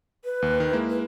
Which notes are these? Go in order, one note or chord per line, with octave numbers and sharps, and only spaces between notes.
B4
D#2
D#3
G#3 A#3 E4
B4